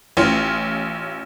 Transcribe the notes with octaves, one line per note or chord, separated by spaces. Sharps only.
A1 C#4 F4